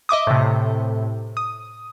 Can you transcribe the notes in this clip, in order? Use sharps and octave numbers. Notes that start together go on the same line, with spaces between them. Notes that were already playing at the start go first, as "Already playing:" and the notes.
D#5 E5 D6 D#6
A2 C3
D#6